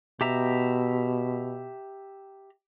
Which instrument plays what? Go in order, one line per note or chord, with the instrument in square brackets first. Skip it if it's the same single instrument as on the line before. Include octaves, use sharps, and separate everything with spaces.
[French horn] B2 [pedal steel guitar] G4 E5 A#5